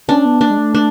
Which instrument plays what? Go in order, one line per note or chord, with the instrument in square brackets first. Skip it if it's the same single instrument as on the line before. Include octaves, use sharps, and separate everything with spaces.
[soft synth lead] C#4 [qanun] D4
[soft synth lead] B3
[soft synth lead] A#3 [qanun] D4
[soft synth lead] G#3
A3
[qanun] D4